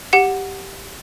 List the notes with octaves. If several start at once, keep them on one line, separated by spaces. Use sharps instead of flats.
G4 F#5 C#7